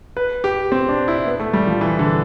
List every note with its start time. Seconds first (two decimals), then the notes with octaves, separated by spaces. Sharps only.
0.17 B4
0.44 G4
0.72 C4
0.89 D4
1.08 E4
1.27 B3
1.39 A3
1.53 G3
1.67 F3
1.81 E3
1.99 D3